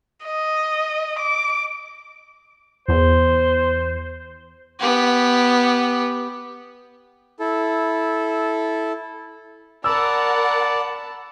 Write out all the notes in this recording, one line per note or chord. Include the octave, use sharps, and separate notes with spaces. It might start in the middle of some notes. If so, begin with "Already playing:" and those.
D#5
D6
E2 C5
B3 G4
E4 A4
A#4 D5 F#5 A5 B5 E6